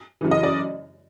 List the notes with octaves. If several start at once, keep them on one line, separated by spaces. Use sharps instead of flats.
F#2 C#3 E3
D#5
D5